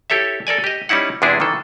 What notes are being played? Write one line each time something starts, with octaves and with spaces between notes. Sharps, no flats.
E4 G4 A4 C#5 E5
A4 A#4 D5 G#5
G4 D#5
G3 C#4 D#4 E4 F#5
E2 C3 G#3 D4 E4 G#4
D#3 E3 A4